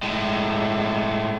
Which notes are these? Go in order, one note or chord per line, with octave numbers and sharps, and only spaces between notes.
A2 G#3